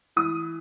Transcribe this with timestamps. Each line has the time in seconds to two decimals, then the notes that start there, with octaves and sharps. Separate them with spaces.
0.16 E3 D#6